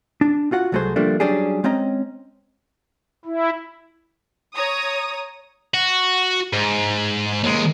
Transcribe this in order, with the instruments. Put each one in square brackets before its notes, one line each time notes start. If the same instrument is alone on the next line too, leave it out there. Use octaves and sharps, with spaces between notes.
[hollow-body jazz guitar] D4
F4 F#4 F#5
C2 F#3 A3 F#4 G#4 C5
D3 F3 G3 A3 A#3 D4
F#3 G3 C#4 D4 G4 G#4
G#3 C4 C#4 D#5 A#5
[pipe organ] E4
[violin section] C#5 A#5 D#6
[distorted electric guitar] F#4
G#2
D#2 G#3